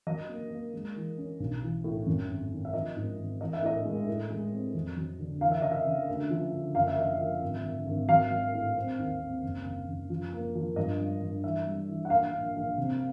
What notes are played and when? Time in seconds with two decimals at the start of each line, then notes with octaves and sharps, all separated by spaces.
0.07 F#3 D#5
0.29 A#3
0.51 A#3
0.73 G#3
0.96 E3
1.18 C#4
1.40 B1
1.62 E3
1.84 A2
2.06 F#2
2.29 G#1
2.52 D#3
2.65 E5
2.74 F3 D#5
2.96 G#2
3.18 G#1
3.40 E3 D#5
3.53 E5
3.63 A2 D#5
3.85 G#3
4.07 A2
4.30 G#3
4.52 C4
4.74 F2
4.97 F#3
5.20 D3
5.41 E3 F5
5.51 E5
5.62 C#3 D#5
5.72 E5
5.86 C#3
6.09 D2
6.30 F3
6.53 D2
6.75 F#1 F5
6.88 E5
6.97 F3 D#5
7.14 E5
7.20 F3
7.42 G#1
7.65 D3
7.87 G#1
8.09 F#3 F5
8.31 F#3
8.54 A2
8.77 C4
8.98 D#2
9.21 C4
9.43 F#1
9.65 F#1
9.88 F#1
10.10 F3
10.33 A#3
10.55 F3
10.76 G2 D#5
11.00 G3
11.21 G2
11.44 E3 E5
11.67 G3
11.89 E3
12.05 F#5
12.10 A#1 F5
12.33 A#1
12.56 A#1
12.78 C3